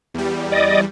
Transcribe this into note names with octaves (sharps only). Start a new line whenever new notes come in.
E2 G3
D5 D#5